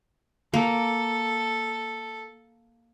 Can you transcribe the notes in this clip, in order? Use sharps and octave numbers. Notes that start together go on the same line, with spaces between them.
A#3 A4